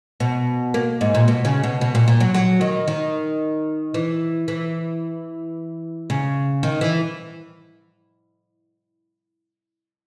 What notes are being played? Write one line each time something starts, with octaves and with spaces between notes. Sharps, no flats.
B2
A#3
G#2
A#2
B2
C#3
B2
B2
A#2
A#2
F#3
F#3
D#3
D#3
E3
E3
C#3
D#3
E3